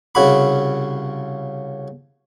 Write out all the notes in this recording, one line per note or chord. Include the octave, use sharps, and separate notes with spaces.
C2 C#3 F#4 B5